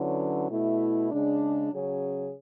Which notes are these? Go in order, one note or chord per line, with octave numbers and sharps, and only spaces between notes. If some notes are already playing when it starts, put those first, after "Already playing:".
Already playing: D3 F#3 C#4 E4 B4
B2 A3 E4
C#3 G#3 D4
C#3 F#3 C#4 G#4 C#5